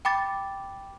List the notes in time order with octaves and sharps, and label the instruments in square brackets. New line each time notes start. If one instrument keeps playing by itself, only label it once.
[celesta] G5 B5 D6 A6